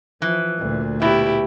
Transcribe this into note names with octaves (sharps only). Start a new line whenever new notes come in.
E3 F3
D2 A#2
B2 E4 G4